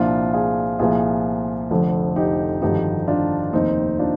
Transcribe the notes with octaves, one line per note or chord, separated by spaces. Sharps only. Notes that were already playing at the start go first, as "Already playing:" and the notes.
Already playing: C2 A#2 F3 D4 F4
F4 G#4
C2 A#2 F3 F4 G#4
F1 F2 D3 F3
D#4 G4
G#1 G2 D3 F3 D#4 G4
D4 F4
F1 D#2 D#3 C4 D#4
D4 F4